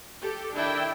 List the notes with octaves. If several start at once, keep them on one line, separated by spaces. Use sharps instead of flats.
G4 A4
D#3 D4 E4 E5 G5